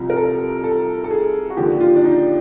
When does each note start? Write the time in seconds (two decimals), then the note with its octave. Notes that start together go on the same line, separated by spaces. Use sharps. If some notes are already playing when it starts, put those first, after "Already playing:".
Already playing: C2 C3 F3
0.10 A#4
0.17 A4
0.64 A4
1.04 A4
1.11 G#4
1.50 F#4
1.57 D#2 D3 F3 G4
1.80 F4
1.96 D4
2.04 D#4